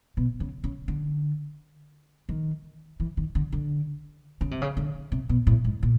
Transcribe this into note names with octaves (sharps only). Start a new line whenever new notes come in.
B2
C#3
C#3
D3
D#3
E3
D#3
D3
D3
C#3
C3
C#3
D3
C3
B2
A2
G#2
A#2